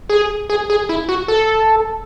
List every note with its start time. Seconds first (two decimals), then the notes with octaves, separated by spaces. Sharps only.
0.10 G#4
0.50 G#4
0.70 G#4
0.89 E4
1.09 F#4
1.28 A4